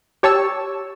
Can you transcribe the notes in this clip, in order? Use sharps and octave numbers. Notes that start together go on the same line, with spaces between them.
G4 C#5 A5 C#6 E6